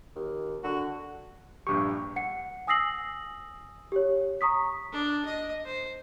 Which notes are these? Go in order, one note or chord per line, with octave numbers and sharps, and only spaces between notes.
D#2
D3 F#4
A#1 G2 G4 C#6
F#5 C#7
G#5 D#6 E6 A#6 C7 F#7
G4 C#5
A#5 C#6 D#6 B6
D4
D#5
C5